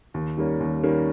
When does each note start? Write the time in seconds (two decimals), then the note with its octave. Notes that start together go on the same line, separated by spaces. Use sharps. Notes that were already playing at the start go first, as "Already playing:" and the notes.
0.14 D#2
0.37 D#3 G3 A#3 C#4
0.60 D#2
0.83 D#3 G3 A#3 C#4